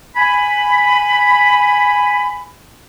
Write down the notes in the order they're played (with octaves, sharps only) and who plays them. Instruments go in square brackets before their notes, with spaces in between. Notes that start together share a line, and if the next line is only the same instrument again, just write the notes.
[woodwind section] G#5 B5